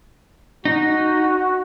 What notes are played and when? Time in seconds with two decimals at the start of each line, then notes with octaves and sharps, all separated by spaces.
0.65 D#4 F#4